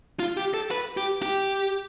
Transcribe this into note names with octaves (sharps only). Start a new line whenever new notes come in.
F4
G4
A4
B4
G4
G4